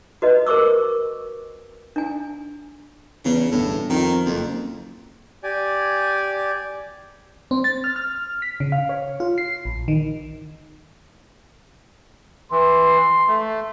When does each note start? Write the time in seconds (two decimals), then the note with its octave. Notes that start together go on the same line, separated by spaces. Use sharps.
0.22 F#4 B4 D#5
0.47 A#4 C5 C#6 D6 E6
1.96 D4 G#5
3.25 E2 C#3
3.52 G1 A2
3.90 F2 D#3
4.26 F#1 F2
5.43 G4 D5 G#5
7.51 C4
7.64 A6
7.84 F6
7.96 F6
8.42 B6
8.60 C#3
8.72 F5
8.89 C#5
9.20 F4
9.38 C7
9.65 A#1
9.88 D#3
12.51 E3 C6
13.28 A3